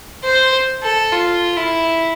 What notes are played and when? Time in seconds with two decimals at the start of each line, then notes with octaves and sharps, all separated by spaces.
0.24 C5
0.83 A4
1.12 F4
1.57 E4